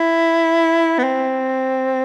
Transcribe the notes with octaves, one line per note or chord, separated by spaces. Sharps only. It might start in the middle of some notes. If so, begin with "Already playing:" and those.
Already playing: E4
B3
C4